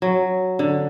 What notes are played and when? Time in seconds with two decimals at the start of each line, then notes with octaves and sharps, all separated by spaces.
0.02 F#3
0.59 D3